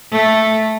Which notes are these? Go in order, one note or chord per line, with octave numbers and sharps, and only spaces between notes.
A3